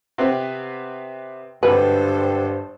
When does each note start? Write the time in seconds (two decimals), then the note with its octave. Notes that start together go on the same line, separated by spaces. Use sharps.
0.18 C3 B3 C4
1.63 G#1 G2 D3 A4 B4 C5